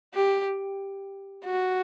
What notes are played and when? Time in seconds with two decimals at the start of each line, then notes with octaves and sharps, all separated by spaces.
0.14 G4
1.45 F#4